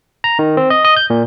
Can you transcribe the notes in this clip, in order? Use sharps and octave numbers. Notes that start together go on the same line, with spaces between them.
A#5
D#3
C4
D#5
D#5
G6
A#2